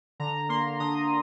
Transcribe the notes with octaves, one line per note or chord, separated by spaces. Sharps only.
D3 A#5
A#3 C6
D3 D#6